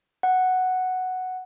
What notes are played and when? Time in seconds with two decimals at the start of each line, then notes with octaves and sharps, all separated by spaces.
0.23 F#5